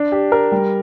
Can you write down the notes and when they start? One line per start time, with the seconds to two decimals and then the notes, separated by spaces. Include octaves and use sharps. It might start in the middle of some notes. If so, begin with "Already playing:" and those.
Already playing: D4
0.12 G4
0.32 A#4
0.52 G3